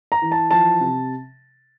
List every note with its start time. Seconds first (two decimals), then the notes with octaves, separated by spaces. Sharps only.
0.12 A#5
0.22 E3
0.32 A5
0.51 F3 A5
0.81 C3